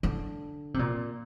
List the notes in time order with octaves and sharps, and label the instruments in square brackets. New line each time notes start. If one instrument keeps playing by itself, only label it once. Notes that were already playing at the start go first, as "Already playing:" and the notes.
[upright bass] D3
C3
A#2